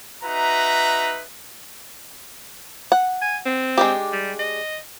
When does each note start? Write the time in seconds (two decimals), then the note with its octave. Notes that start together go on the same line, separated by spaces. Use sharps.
0.24 D#4 F#4 B4 E5 A#5
2.92 F#5
3.21 G#5
3.45 C4
3.78 G#3 D4 G4
4.13 G3
4.39 D#5